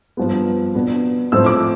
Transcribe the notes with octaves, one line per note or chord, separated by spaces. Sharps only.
G2 F3 B3
B2 B3 D4
A2 F3 C4 E6
D6